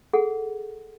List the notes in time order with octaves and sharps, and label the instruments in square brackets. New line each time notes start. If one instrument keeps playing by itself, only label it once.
[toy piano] G#4 A4 F#5